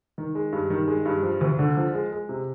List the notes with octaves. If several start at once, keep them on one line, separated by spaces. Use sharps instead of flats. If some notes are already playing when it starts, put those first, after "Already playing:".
D#3
G#3
G2
D#3
G#3
G2
F3
D2
D3
F3
G#3
G#3
C3